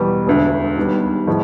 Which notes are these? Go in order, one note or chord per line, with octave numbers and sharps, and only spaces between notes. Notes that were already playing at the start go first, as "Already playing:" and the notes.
Already playing: E2 B2 G3
E1 D2 D3
D#2 D#3 G3 B3
A2 F3 G#3